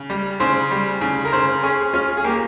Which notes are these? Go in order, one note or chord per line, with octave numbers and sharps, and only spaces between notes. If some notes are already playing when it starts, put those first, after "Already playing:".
Already playing: C#3
G3
C#3 C5
G3
C#3
A#4
C#3 C5
C#4 G#4
C#4 F4
G#4
A#3 G4